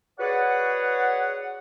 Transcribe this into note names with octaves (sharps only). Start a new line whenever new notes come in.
F#4 G#4 B4 C#5 D5 F#5